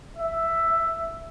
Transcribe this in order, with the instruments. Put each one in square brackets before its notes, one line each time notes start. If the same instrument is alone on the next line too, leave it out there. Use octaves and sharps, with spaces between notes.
[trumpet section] E5